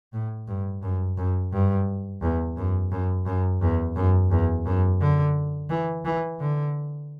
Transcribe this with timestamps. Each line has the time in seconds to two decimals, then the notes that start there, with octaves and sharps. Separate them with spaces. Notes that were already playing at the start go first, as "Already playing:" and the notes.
0.13 A2
0.47 G2
0.83 F#2
1.17 F#2
1.52 G2
2.22 E2
2.57 F#2
2.91 F#2
3.26 F#2
3.61 E2
3.96 F#2
4.31 E2
4.65 F#2
5.01 D3
5.70 E3
6.05 E3
6.40 D3